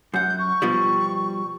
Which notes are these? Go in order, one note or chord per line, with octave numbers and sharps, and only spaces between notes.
F#2 F#5 G6
C#6
B2 F3 G3